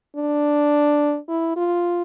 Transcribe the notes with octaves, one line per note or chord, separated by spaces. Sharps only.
D4
E4
F4